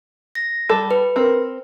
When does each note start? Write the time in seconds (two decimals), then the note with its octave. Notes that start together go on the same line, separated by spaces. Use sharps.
0.35 A#6
0.69 G3 A4
0.91 B4
1.16 C4 A#4